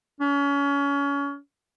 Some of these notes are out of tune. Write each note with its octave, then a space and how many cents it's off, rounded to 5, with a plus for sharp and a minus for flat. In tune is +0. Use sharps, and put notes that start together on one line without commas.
C#4 +30